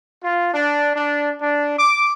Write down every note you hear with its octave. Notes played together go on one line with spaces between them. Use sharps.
F4
D4
D4
D4
D6